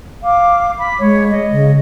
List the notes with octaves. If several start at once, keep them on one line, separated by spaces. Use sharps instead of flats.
F5 D6
B5
G#3 C#5
D#5
C#3